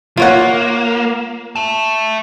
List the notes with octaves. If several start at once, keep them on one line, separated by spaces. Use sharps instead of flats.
A#3 F4 C#5 F#5
E5 A5